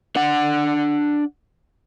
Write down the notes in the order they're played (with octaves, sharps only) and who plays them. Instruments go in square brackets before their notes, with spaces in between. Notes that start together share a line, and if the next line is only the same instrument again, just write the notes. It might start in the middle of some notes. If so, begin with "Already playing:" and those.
[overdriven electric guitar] D4 F#5